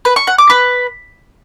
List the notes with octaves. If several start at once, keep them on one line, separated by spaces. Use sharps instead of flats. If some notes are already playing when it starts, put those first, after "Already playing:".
B4
C#6
F#5
D6
B4